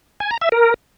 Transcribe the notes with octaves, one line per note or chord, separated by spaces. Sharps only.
G#5
A#5
E5
A#4